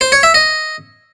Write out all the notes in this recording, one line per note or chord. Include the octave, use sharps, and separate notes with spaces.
C5
C#5
E5
D#5